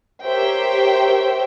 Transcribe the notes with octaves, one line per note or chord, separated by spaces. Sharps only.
G4 A#4 C5 C#5 E5 G5